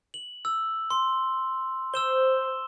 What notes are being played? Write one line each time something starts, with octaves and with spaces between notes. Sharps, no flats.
F#7
E6
C6
C5 E6 E7 G7